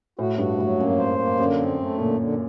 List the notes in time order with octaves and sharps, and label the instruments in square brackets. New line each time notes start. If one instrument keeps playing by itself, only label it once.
[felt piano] A2 [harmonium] F#4
[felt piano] G2 [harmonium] F#4
[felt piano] A2 [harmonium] F#3
[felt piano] F#2 [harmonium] A#3
[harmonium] C5
A#3
[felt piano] F#2 [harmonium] D3
[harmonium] C4
A3
[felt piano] A#2 [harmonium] D3
[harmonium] D3